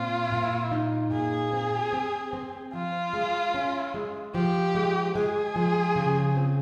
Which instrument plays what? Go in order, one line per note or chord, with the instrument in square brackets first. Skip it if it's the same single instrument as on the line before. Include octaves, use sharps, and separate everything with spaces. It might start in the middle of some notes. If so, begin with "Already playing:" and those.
Already playing: [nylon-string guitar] A#2 C4 [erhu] F4
[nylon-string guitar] A#2
D#4
[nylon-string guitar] A#2 [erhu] G#4
[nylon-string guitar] C4
C4
C4
[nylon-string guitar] F3 [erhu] F4
[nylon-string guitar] G#3
C#4
G#3
[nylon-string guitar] F3 [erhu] G4
[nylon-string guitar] G#3
[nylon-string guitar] G#3 [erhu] G#4
[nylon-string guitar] F3
C#3
C4